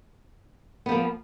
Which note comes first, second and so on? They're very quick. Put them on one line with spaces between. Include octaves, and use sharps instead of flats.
B3 F3 A#3